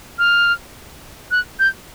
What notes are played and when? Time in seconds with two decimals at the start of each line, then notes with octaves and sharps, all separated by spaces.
0.18 F6
1.31 F#6
1.59 G6